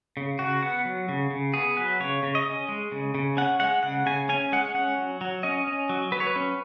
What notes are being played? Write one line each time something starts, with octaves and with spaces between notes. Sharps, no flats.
C#3
C#3 F#4
B3 F#5
F#3
C#3
C#3
B3 G#4
F#3 B4
C#3 C#5
C#3
D#5
C#4
G#3
C#3
C#3
C#4 F#5
G#3 F#5
C#3 F#5
C#3 G#5
C#4 G#5
G#3 F#5
C#4 F#5
F#3
F#3
C#4 D#5
C#4
F#3
F#3 B4
C#5
B4
C#4